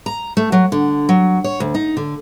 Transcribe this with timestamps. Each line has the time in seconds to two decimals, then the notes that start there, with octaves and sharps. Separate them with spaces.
0.06 A#5
0.37 A3
0.52 F#3
0.72 D3
1.09 F#3
1.44 C#5
1.60 D2
1.75 D#4
1.97 D3